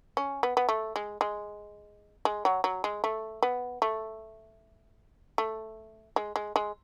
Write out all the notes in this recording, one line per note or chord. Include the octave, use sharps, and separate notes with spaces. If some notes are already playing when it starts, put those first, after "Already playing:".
C#4
B3
B3
A3
G#3
G#3
G#3
F#3
F#3
G#3
A3
B3
A3
A3
G#3
G#3
G#3